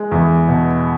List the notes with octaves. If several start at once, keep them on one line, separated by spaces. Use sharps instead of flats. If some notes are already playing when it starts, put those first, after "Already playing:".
Already playing: G#3
E2
B2